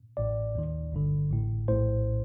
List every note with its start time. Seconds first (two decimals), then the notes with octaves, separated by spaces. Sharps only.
0.17 A1 A2 D5
0.55 D#2 D#3
0.92 G1 G2 D3
1.30 A1 A2
1.68 A#1 A2 C5